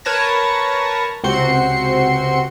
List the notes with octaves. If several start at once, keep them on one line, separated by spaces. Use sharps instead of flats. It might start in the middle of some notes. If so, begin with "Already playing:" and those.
A#4 B4 C#5 A5 G#6 A#6
C#2 C3 C4 F#4 C6 C#7